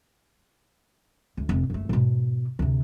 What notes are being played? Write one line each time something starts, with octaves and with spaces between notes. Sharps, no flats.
D2
F1
F#1 A3
G#2 B2
D2 C3